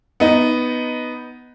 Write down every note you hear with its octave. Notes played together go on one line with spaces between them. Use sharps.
B3 D#4